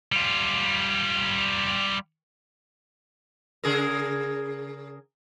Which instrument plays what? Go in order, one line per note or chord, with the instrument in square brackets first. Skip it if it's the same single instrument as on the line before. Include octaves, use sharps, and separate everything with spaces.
[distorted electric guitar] G3 F4
[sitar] C#3 G#4 A#4